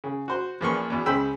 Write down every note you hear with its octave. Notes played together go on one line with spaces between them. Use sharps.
C#3
F#4 C5
E2 A#2 F3 B4 C6 C#6
E2 B2
C#2 C#3 C5 G5 B5 E6